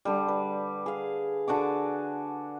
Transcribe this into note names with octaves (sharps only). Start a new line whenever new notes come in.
D3 G3
B4
G#4 F5
D3 F#4 G#5 D6